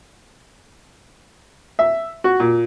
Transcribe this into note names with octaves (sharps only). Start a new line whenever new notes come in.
E5
F#4
A#2